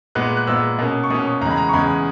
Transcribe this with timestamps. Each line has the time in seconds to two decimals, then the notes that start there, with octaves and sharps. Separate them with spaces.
0.15 A#2 G#3 B3 F#6
0.37 F#6
0.47 A#2 G#3 B3 E6
0.78 B2 A#3 C#4
1.04 C#6
1.10 B2 A#3 C#4 D#6
1.26 C#6
1.41 E2 C#3 G#3 A#5
1.50 B5
1.57 A#5
1.69 C#6
1.73 E2 C#3 G#3 B5